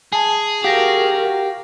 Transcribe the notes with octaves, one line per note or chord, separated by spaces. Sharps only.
G#4 G#5 A5
F#4 G4 A#4 F5 A#6